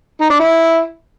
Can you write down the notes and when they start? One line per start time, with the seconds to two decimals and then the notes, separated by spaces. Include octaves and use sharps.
0.20 D#4
0.30 D4
0.39 E4